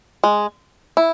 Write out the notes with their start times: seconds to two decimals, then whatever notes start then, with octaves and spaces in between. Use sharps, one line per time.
0.24 G#3
0.97 E4